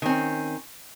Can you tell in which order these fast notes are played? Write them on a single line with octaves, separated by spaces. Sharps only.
D#3 C4 C#4